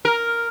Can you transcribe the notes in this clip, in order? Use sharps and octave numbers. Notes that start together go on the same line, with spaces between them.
A#4